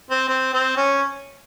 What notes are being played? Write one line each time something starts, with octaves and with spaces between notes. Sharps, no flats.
C4
C4
C4
C#4